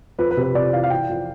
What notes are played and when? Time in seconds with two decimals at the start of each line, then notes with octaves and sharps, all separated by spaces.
0.19 F2 B4
0.31 B4
0.37 C3
0.43 B4
0.55 C3 D5
0.73 E3 F5
0.84 F5
0.90 E3 G5
1.09 F2